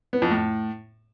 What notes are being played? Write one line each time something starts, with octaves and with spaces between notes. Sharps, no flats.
B3
F2
A2